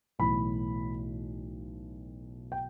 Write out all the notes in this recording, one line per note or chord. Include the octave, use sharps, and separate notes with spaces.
B1 A2 E3 B5
G5